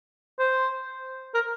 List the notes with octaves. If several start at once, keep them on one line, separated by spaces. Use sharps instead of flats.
C5
A#4